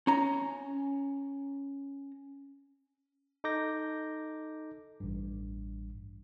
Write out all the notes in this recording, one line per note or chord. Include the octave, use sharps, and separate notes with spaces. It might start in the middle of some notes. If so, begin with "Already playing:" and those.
C#4 A#5
D#4 A4 D6 G6 A#6
A1 G2